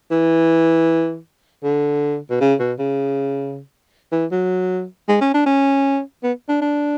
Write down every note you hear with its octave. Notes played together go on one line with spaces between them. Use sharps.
E3
D3
B2
C#3
B2
C#3
E3
F#3
G#3
C#4
D4
C#4
B3
D4
D4